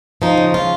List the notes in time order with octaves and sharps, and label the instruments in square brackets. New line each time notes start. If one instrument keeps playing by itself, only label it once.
[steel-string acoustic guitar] F3 D#4
C#3
F4